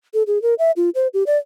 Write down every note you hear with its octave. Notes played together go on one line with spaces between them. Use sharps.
A4
G#4
A#4
E5
F4
C5
G4
D5